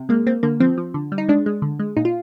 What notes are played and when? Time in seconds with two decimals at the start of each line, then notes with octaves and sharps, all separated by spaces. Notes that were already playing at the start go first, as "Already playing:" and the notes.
Already playing: C3
0.09 G#3 A#3
0.26 A#3 C4
0.43 D3 A#3
0.60 F3 C4
0.78 F3
0.94 D3
1.12 G3
1.18 D#4
1.29 G#3 D4
1.46 G#3
1.62 D3
1.79 G#3
1.96 A#2 D#4
2.05 F4